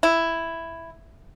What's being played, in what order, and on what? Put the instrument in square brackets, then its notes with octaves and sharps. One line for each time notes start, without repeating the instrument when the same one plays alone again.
[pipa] E4